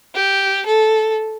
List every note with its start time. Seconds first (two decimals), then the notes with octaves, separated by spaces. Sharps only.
0.15 G4
0.66 A4